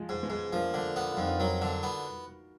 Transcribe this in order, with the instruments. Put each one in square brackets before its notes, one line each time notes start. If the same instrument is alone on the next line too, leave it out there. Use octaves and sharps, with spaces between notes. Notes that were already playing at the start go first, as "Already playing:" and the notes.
Already playing: [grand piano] F3 G#3
[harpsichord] G#2
[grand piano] G#3 B3
[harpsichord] G#2
[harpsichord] F3 [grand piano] A#3 D4
[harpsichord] D3
B3
[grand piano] F4
[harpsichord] F2 [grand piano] D#4
[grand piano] D4 F4
[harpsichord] F#3 [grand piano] F#4 A#4
[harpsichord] D3
B3